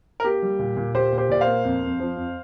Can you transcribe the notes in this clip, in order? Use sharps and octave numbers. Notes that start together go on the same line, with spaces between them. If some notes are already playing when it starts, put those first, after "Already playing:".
A#4
A#3 G4
G3
A#2
A#2
A#2 G4 C5
A#2
G4 C5
A#2 D5
C5 F5
A#3
F2
F2
F3
F2